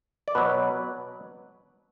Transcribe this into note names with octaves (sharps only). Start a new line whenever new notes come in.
D5
B2 F#3 B4